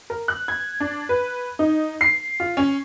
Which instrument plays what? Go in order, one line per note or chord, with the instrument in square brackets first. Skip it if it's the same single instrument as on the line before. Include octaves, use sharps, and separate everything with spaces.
[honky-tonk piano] A#4
F#6
G#6
D4
B4
D#4
C7
F4
C#4